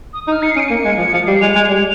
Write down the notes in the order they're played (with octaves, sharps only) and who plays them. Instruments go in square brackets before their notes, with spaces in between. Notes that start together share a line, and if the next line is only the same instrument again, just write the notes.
[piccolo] D#6
D#6
[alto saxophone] D#4
[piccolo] F6
[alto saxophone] D#4 [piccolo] C#7
[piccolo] C7
[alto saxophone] C#4 [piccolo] D#7
[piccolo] C#7
[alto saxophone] A#3
G#3
F3
F3
[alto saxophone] G3 [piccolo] C7
[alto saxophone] G#3 [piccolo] F7
[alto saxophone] G#3 [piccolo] F7
[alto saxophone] G3